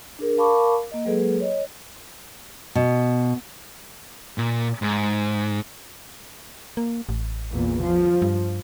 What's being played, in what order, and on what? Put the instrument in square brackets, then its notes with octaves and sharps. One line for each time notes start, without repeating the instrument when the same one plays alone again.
[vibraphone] D4 G#4 A#4
A#4 F5 A5 B5 C#6 D6
A#3 D#5
F#3 G#3 A#3 G#4 A4 B4
C#5 D#5
[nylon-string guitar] B2
[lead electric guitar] A#2
G#2
[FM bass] A#3
A1
[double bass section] E2 A#2
F3
[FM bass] G2